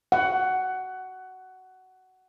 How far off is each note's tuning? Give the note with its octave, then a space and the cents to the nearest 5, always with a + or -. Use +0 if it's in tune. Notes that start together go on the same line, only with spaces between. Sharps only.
F#5 +15